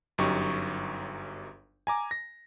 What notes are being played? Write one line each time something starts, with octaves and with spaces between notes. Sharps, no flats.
G1 F#2 F#3 D#4 G4 C#6
G#5 A#5 D6
A#6